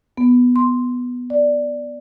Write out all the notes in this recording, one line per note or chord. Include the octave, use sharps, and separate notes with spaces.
B3
C6
D5